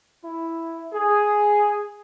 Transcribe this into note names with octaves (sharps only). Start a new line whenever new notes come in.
E4
G#4